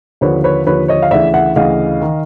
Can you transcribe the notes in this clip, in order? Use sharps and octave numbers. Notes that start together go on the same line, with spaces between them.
D#2 D3 F3 B4 C#5
B4 C#5
D#2 D3 F3 B4 C#5
C#5 D#5
F5
D2 C#3 E3 D5 E5
E5 F#5
D2 C#3 E3 D#5 F5
D#3